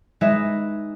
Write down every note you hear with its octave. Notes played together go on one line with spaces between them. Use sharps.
G#3 D#4 B4 D#5 E5